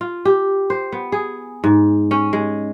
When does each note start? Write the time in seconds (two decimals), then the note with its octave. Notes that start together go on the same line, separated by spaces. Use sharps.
0.01 F4
0.25 G4
0.70 C5
0.92 B3
1.12 G#4
1.64 G#2
2.11 C#4
2.33 G#3